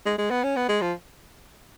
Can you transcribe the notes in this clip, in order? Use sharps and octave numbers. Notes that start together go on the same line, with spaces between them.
G#3
G#3
B3
C#4
B3
G#3
F3